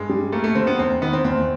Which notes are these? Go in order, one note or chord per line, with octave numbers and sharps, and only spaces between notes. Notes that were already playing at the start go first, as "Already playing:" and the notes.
Already playing: G2 G#3
G3
A3 A#3
A3
D3 C4
B3
E2 C4
D#3 B3
C4
E2 C4